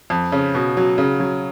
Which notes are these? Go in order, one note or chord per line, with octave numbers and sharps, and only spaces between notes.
F2
C#3
B2
F#3
C#3
F#3